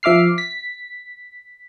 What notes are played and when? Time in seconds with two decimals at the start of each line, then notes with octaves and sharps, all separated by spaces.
0.03 F3 E5 D6 F6 C7
0.38 B6